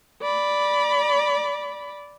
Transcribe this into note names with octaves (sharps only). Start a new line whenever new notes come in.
D5 B5